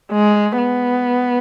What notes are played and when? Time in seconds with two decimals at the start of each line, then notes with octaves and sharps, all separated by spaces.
0.12 G#3
0.57 B3